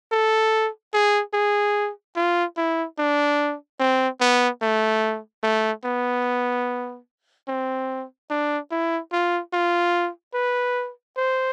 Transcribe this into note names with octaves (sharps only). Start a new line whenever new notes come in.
A4
G#4
G#4
F4
E4
D4
C4
B3
A3
A3
B3
C4
D4
E4
F4
F4
B4
C5